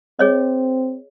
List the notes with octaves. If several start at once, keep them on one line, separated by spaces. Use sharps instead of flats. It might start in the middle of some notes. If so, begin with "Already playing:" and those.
C4 G#4 C#5 D#5